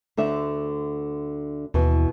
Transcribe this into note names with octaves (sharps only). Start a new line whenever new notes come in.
D2 D3 E5
D#2 B2 E3